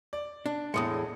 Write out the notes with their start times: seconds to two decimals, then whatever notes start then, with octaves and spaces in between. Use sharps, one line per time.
0.13 D5
0.46 D4
0.74 E2 A2 G#3 D#6 C#7